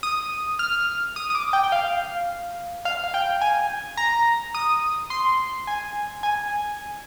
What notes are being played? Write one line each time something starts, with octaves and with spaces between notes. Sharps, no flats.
D#6
F6
D#6
D#6
D6
G5
G5
F5
F5
F5
G5
G#5
A#5
D#6
C6
G#5
G#5